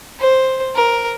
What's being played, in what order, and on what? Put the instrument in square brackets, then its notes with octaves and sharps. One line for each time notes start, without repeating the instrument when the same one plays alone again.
[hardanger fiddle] C5
A#4